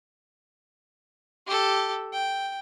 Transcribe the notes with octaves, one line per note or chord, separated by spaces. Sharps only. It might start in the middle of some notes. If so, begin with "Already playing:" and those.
G4 A4
G5